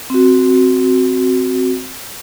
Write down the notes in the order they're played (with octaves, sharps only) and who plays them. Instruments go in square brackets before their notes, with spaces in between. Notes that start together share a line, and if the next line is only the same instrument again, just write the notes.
[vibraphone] C4 F#4